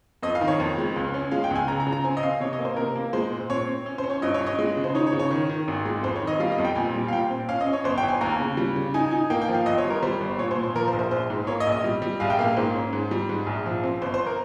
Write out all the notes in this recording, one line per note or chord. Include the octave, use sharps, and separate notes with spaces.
F2 D#5
F5
D#3
C#5
F2
G#3
C#2
C#4
G#3 F5
G5
C#2 G#5
C#3 A#5
A#5
C#3
A#5
C4 G#5
D#5
C4 F5
C3 C#5
D#5
A#3
C5
C3 A#4
A#3
G#3 C5
A#2
C4 C#5
C4
C#4
C5
C#4
C#5
G2 D#5
C#5
C#4
D#5
G#3
C#3
C5
D#4 C#5
C#5
C#3
C#5
D#3
D#3
G#1
G#3
F2 C5
C#5
D#3
D#5
G3 F5
D#5
F2
G5
A#2 G#5
G3
F5
A#2 G5
C4
C#4 F5
D#5
C#4
C#5
G1 C5
G5
G1
G#5
D#2 A#5
C#3
G3
C#3
D#4 G#5
D#4 G#5
A#3 G5
G5
F3
F5
G1 D#5
C#5
G3
A#4
G3 C5
G1
A#2 C#5
C5
A#2
C5
F3 A#4
C5
A#1
C5
A#1 C5
G#2
A#3 C#5
D#5
A#1
D#5
G3
G3
A#1 F5
G5
A#3 F5
G#2 C5
C#4
G#2
G3
G#2
A#1
F3
C4
G1 C5
C5
A#4